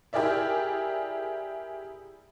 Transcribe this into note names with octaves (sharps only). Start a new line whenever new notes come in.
E4 G4 G#4 A#4 D5 E5